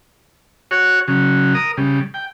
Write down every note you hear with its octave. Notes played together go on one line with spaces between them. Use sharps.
F#4 C#5
C#3 F#3
A#4 D#6
C#3 G3
G5